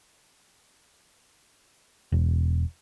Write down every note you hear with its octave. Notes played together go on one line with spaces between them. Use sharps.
E1